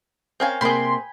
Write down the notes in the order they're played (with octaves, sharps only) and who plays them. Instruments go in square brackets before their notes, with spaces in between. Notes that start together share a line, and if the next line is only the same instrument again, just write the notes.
[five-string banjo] C4 C#4 F5 [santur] A#4 G5 G#5
[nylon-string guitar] C3 A#3 [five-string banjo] C4 G#4 [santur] B5 [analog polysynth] C6